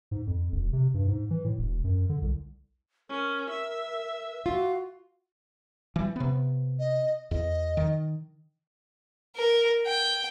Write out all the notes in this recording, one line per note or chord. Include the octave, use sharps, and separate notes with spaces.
G#2
F2
E1
C3
G2
G#2
E3
A2
E1
F#2
D3
C2
C#4 A#4
E5
F4 F#4
E3 G3
C3 B3
D#5
E2 D#5
D#3
A#4
G5